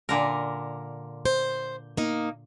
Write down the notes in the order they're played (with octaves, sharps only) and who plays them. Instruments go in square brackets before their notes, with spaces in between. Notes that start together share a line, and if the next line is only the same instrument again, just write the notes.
[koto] A#2 D3 A#4
[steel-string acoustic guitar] C5
A#3 D#4